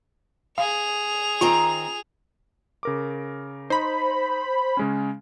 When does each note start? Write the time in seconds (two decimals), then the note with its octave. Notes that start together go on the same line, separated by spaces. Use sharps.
0.58 G#4 F5 F7
1.41 D#3 C4 F4 A#5
2.83 C#3 A#4 D6
3.70 D#4 C5 B5
4.77 C#3 G#3 C#4